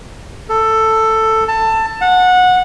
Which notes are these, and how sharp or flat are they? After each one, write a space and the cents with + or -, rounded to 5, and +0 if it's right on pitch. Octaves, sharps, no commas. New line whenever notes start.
A4 +10
A5 +20
F#5 -20